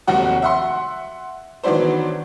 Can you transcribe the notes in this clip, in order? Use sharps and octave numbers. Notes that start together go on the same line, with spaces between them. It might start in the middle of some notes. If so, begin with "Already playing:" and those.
F1 D#2 F#3 F#4 F#5
E5 F#5 C6
D#3 E3 F#3 B3 D4 C5